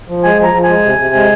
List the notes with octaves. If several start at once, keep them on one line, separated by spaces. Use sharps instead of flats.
F3
G#3 G#5
F3 A#5
F3
G#5
G#3
C3
C3
G#3